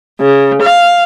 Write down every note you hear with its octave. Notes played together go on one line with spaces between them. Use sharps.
C#3
F5